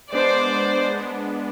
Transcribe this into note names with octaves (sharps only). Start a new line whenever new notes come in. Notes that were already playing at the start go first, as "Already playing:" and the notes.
G#3 B3 D4 C5 D5
G#3 B3 D4